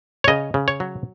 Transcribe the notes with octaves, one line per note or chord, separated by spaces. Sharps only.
C#5
C#3 D#5
C#3
C#5
F#3